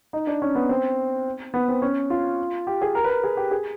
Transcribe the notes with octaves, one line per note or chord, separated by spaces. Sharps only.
D#4
D4
C#4
B3
C4
B3
C4
C#4
F4
G4
G#4
A#4
B4
A#4
G#4
G4
G#4